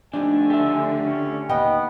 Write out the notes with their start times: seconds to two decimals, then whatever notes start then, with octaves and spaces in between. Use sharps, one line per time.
0.13 D3 F3 A3 C4 D4 D#4 G4 G#5
0.50 G4 E5
1.03 C#4
1.49 D#2 B3 D#5 G5